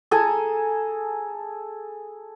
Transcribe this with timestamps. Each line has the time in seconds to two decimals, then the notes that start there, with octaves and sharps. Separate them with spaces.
0.11 G#4 A4 G#5 A#5